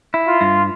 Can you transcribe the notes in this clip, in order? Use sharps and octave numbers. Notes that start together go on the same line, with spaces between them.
E4
F4
G2